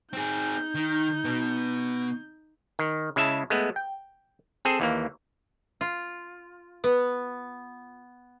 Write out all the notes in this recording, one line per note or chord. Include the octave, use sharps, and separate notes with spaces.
C4 D#4 G#4 G6
D#3
B2 B3
D#3
C#3 G#3 E4 E5 A5
G#3 A3 B3
G5
C4 G#4 A4
D#2 E3 A#3
F4
B3